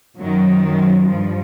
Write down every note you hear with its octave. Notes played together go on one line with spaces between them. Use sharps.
F#2 D#3 F#3
F#3
G2 F3